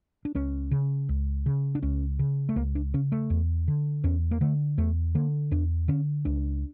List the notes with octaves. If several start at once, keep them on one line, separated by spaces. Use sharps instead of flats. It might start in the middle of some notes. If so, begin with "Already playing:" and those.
D4
C#2 C#4
C#3
C#2
C#3
D4
C#2 C#4
C#3
A3
C#2 A#3
D4
C#3 C#4
A3
E2
D3
E2 C#4
A#3
D3 A3
E2 A3
D3 A#3
E2 D4
D3 C#4
C#2 D4